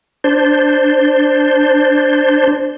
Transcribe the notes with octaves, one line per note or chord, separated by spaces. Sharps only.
D4 C5